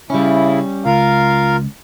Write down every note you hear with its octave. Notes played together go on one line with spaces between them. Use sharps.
C#3 G3 C#4 E4
C#2 F4 A#4 F5